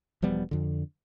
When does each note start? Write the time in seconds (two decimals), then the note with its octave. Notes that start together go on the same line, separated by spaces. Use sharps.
0.22 E1 F3 G3 B3
0.51 F2 D3